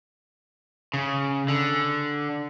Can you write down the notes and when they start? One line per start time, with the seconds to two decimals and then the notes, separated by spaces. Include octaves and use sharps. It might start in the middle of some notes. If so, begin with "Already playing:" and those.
0.94 C#3
1.48 D3